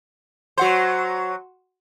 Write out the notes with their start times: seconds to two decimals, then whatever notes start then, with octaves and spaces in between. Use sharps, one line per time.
0.58 F#3 F#4 C5 F#5 C6